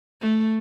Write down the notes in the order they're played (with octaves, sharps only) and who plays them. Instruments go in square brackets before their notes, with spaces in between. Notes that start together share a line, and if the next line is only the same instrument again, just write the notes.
[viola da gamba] A3